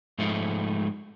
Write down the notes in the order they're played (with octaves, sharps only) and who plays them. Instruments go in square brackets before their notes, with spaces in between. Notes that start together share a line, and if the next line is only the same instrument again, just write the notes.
[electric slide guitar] G#2 F3 G#3 A3 D#4